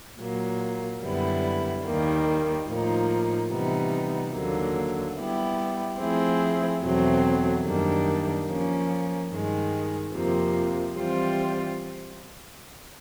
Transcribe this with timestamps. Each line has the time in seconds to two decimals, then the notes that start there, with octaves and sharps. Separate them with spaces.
0.21 A#2 F#3 A#3
1.04 F#2 D3 G3 B3 E4
1.86 D#2 D#3 G3 A#3
2.69 A2 F3 A#3 D#4
3.52 C3 E3 G3 B3 D#4
4.35 D#2 D3 F#3 A#3
5.18 G3 B3 E4 G4
6.01 F3 A3 C4 E4 G#4
6.83 E2 B2 F#3 A3 C4
7.66 F#2 D#3 G3 A#3 D4
8.48 F3 A#3 C#4
9.31 G2 D#3 G#3
10.14 F2 C3 F3 A#3
10.97 E3 G3 C4 F4